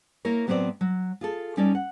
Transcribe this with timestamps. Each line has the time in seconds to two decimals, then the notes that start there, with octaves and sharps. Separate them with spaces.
0.25 A#3 E4 A#4 C#5
0.47 A2 F#3 B3 C4 C5 D5
0.81 F#3
1.21 F4 G#4 A4
1.57 G3 C#4 D#4 A4 C#5 D5
1.75 F#5